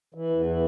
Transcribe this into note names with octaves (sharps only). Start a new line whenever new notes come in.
E3
E2
E3